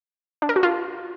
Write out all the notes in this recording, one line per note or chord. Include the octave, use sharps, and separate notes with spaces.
D4
A#4
F#4
F4